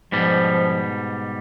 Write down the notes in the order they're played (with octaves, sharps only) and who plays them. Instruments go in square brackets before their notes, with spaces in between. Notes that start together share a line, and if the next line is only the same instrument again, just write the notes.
[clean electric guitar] G#2 B2 G3 [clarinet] F3